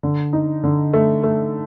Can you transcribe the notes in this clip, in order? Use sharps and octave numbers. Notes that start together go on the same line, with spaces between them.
D3
D#4
D3
A3
A3